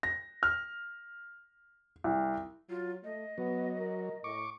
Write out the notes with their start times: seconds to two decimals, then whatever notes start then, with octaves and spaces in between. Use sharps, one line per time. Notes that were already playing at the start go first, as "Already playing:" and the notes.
0.03 A#6
0.43 F6
2.04 C2
2.69 F#3 F4
3.04 A3 D#5
3.38 F#3 B3
3.78 A#4
4.24 A2 C#6 D6